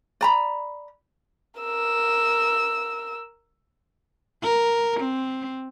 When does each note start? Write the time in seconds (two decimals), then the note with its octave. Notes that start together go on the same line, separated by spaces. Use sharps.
0.21 D5 A#5 B5
1.60 A#4 E6
4.43 A#4
5.00 C4